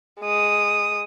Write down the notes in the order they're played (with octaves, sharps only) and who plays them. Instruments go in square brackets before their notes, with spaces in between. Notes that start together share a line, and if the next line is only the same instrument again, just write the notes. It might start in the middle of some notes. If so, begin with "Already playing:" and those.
[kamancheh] G#3 D#6